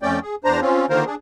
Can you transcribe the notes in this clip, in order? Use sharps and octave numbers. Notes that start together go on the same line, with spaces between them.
F2 A3 C#4 D5 G5
G#4
E2 D4 C5 A#5
C4 C#4 F4
D3 D#3 A#3 F4 A#4 C5
D4 G#4